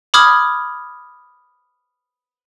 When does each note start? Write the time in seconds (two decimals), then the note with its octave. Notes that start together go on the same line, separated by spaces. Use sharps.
0.14 B5 D6 D#6 F6 G#6